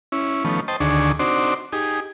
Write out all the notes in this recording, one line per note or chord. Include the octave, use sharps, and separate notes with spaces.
C#4 E4
D#3 F3 A3 B3 C#4
C5 D#5 G5 A5
D2 D3 D#3 D4 G#4 C#6
C4 D4 D#4 F#4 C5 D5
D#4 G4 G#4